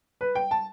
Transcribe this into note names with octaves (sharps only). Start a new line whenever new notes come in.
B4
G5
A5